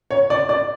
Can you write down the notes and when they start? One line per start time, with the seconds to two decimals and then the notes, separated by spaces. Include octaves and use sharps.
0.11 C#5
0.30 D5
0.49 D5